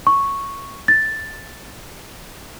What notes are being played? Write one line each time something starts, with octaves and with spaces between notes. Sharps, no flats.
C#6
A6